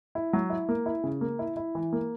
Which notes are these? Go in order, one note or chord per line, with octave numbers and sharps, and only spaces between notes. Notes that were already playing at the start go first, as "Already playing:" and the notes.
E4
F#3
E4
A#3
E4
C#3
A#3
E4
E4
E3
A#3